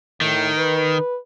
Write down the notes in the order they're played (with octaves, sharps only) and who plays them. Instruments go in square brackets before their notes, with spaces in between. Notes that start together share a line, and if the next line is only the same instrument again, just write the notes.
[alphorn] A2 [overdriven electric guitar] D#3
[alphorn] B4